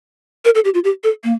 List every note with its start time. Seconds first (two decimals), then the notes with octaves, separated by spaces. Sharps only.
0.45 A#4
0.55 A4
0.65 G4
0.74 F4
0.84 G4
1.04 A4
1.24 A#3